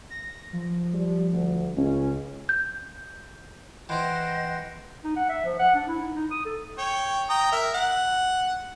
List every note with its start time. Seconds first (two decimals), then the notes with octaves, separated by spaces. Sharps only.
0.10 A#6
0.53 F3
0.94 G3
1.33 D2
1.77 C#2 C#4
2.49 G6
3.89 E3 C4 D#5 F#5 G5 C6
5.04 D#4
5.16 F#5
5.29 E5
5.45 F3
5.59 F#5
5.75 D4
5.88 E4
6.02 D#4
6.15 D#4
6.31 D#6
6.45 A4
6.78 C#5 G5
7.29 G5 A#5 D#6
7.52 A#4 E5
7.74 F#5